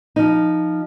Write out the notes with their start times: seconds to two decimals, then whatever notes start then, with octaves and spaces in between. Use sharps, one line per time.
0.16 F3 D#4